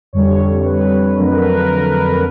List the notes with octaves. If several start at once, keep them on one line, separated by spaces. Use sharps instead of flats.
F2 D3 G3 C#5
B4
F2 D3 F#3 A3 A#4
B4
A#4
B4
A#4
B4
A#4
B4
A#4
B4
A#4
B4
A#4